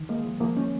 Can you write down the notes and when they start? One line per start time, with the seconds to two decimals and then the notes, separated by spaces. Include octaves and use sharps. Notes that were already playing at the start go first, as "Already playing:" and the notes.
Already playing: D#3
0.09 G#3 A#3
0.25 F3
0.41 F3 A#3
0.57 C#4